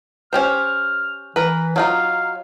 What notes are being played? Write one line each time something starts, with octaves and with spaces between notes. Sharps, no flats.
C#4 G4 C5 F6
E3 A#4 B4
F#3 D#4 F4 F5